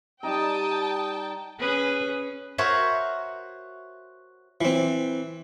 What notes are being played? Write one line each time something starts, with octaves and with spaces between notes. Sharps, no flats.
G3 D#4 G5 A5 A#5 D#6
C#4 G#4 B4
F#4 A#4 C5 C#5 E5
E3 C4